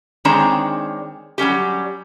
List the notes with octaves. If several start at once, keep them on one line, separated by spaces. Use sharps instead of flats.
D#3 G#3 C4 D4 C#5 A#5
F#3 G3 C#4 G4